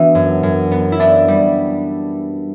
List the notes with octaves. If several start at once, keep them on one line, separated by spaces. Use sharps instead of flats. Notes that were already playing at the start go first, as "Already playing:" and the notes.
Already playing: E3 B3 D4 F#4
F#2
F#2
B3
E4
B3 D4
G3